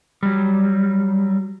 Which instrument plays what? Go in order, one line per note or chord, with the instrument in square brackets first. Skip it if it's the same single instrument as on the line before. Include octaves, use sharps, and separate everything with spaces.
[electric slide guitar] F#3 G3